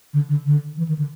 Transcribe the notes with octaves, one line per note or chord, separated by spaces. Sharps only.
D3
D3
D3
E3
D#3
D3